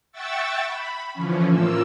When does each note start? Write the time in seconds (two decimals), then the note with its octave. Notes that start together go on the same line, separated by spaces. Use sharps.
0.12 E5 F#5 G5 C#6 E6 A6
0.64 B5
1.14 D3 E3 F3 C#4
1.51 A2 A#3 F4 E6